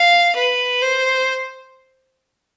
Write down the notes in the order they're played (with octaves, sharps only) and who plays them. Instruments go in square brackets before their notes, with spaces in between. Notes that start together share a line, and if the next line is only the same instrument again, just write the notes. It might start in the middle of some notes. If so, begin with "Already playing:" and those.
Already playing: [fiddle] F5
B4
C5